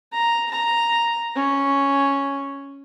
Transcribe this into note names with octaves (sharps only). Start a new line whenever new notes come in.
A#5
A#5
C#4